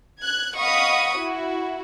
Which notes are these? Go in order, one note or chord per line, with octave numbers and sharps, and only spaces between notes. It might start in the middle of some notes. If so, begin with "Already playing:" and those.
F#6 G#6
D#5 F5 F#5 B5 C#6 D#6
E4 F#4